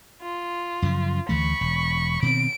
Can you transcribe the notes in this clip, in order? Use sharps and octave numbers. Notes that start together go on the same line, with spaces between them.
F4
F#2 C#3 F3
D2 E3 A3 B5 C#6
E1
B2 D#3 C4 D7